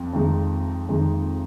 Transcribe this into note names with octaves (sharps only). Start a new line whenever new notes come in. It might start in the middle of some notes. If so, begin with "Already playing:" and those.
Already playing: F2
F2 D#3 G#3 D#4
F2 D#3 G#3 D#4